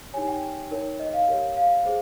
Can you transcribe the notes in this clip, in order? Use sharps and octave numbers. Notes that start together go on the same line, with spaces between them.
D#4 G4 C#5 G#5
G5
D#4 A#4 C#5
D#5
F5
G4 A#4 C#5
F5
G#4 C5